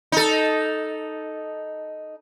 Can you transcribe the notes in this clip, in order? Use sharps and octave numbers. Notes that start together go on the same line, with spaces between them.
D#4 A4